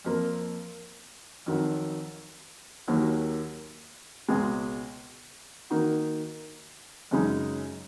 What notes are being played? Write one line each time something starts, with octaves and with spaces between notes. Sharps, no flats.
F2 F3 A#3
F2 D#3 F#3
D#2 D#3 F#3 A#3
C#2 B2 G#3
D#3 A#3 D#4 F#4
F#2 C#3 G#3 D#4